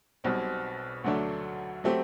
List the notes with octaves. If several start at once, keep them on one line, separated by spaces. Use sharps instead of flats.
B1 B2 G3 C4
D2 D3 F#3 A3 D4
F#3 A3 C4 G4